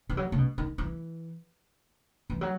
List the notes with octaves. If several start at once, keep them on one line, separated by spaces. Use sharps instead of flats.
E3
F#3
C#3
B2
D#3
E3
E3
F#3